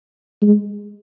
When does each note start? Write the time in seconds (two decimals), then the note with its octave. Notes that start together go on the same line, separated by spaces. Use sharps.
0.42 G#3